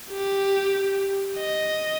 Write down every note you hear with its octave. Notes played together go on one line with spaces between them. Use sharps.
G4
D#5